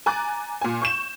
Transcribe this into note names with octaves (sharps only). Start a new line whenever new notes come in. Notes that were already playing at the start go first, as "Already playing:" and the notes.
G#5 A#5 D6 F#6 A6
A#2 G#5
C#6 G6 E7